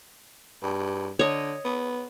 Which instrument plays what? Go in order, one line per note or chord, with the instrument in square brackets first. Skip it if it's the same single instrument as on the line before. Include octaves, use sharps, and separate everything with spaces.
[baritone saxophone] G2
[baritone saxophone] D3 [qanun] C#5 D#5
[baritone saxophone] B3